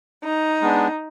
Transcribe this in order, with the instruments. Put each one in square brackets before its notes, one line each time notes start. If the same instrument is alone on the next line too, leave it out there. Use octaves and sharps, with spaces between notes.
[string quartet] D#4
[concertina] G#3 B3 D4